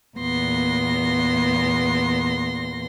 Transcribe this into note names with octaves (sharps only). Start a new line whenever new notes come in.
E2 A#2 A#3 B3 C6 A#6